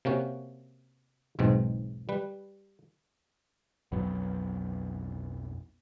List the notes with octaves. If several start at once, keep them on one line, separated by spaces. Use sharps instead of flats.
C3 A#3 C#4 F#4
B1 E2 G#2 B2 C4
G3 B4
B1 F2 F#3 B3